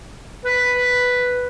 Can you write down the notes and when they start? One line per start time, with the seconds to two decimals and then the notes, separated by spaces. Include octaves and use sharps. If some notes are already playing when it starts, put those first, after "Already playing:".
0.45 B4